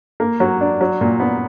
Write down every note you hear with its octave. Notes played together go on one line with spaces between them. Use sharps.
A#3
F#3
D4
F#3
A#2
B3